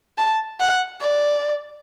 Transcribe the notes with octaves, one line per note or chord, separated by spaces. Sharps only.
A5
F#5
D5